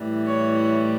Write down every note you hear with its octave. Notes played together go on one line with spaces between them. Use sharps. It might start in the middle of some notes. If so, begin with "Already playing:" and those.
Already playing: A2 E3 G3
C#5